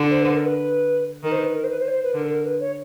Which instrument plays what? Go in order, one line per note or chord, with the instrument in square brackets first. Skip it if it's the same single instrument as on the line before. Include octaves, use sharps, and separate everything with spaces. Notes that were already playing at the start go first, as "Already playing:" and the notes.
Already playing: [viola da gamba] D3
[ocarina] C5
B4
A#4
B4
[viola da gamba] D#3 [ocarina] A#4
[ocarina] C5
B4
A#4
C5
B4
C5
C#5
C5
B4
[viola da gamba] D3 [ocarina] A#4
[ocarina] A#4
B4
C#5